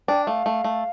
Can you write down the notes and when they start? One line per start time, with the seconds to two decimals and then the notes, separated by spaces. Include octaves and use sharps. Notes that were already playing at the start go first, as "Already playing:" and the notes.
0.08 D4 G5
0.27 A3 F5
0.46 A3
0.64 A3